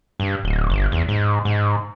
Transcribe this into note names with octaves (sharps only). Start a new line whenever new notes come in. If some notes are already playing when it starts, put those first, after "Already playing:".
G2
D1
G1
E2
G#2
G#2